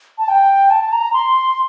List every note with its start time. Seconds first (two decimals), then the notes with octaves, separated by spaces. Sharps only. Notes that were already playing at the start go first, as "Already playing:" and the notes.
0.18 A5
0.28 G5
0.70 A5
0.92 A#5
1.13 C6